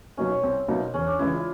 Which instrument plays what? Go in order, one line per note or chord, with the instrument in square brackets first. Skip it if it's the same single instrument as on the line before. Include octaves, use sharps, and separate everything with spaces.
[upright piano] B2 F#3 A#3 D#4 [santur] C#4
[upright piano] C2 [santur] C4
[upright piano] B2 F#3 A#3 D#4
[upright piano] E2 [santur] C#4
[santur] D4
[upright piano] C#3 E3 G#3 [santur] E4
[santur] F4